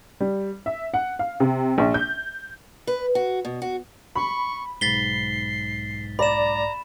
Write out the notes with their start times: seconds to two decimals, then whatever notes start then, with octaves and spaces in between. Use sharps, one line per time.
0.20 G3
0.66 E5
0.94 F#5
1.19 F5
1.40 C3
1.78 A#1
1.94 G6
2.87 B4
3.15 F#4
3.45 B2
3.62 F#4
4.15 B5 C#6
4.81 B1 G#2 A6 B6 C7 G7
6.19 D5 A#5 B5 E7